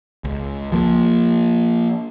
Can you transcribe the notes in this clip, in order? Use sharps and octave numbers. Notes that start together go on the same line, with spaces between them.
C#2
F3 A#3